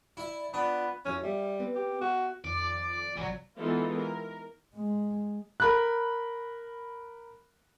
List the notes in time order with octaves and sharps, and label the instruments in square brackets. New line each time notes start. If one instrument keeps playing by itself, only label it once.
[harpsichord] E4 E5 [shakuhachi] D5
[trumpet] B3 [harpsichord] D4 [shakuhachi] F4 [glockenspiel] B5
[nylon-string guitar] F2 E4 F#4 [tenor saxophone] C#4
[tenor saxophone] G3 [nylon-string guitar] E5 F5
[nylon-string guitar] B3 C4 B4
[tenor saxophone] G4
[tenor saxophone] F#4 [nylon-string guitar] E5
[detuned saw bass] F2 [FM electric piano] D#3 [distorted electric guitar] D5 [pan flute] D6
[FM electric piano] G#1 C3 [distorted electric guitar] E3 F#3 [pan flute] D5
[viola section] E3 G#3 B3 D#4 F4 A4
A#4
[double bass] G#3
[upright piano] A#4 B5 F#6